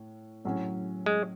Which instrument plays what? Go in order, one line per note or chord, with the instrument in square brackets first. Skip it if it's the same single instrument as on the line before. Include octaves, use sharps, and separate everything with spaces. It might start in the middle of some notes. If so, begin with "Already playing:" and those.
Already playing: [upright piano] A2
A2 F#3 C#4
[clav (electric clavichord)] G#3